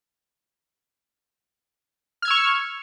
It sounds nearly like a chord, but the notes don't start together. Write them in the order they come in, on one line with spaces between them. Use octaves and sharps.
F6 G#6 E6 C#6